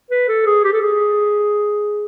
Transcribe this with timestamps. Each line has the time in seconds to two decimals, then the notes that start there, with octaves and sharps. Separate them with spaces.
0.11 B4
0.28 A4
0.46 G#4
0.64 G4
0.73 A4
0.82 G#4